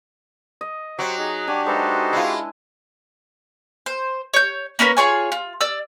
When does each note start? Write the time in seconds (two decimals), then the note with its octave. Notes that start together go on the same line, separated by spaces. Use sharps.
0.61 D#5
0.99 F#3 G4 C5 C#6 D6
1.18 D#4 G#4
1.48 D4 F#4 G4 G#5
1.66 G#3 D#4 A4 B4 C5 E5
2.13 G#3 E4 F4
3.86 C5
4.34 C#5 G6
4.79 A#3 C#4 A#4 B4
4.97 F4 G#4 C#5 G#5
5.32 F4
5.61 D5 E6